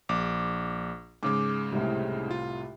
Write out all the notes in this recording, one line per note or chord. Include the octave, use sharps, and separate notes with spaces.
A#1 D6
G#2 C#3 G#3 D6
C2 A2 C3
F4